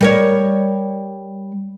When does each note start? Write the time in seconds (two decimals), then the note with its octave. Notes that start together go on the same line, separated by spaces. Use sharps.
0.01 G3 A#4 C#5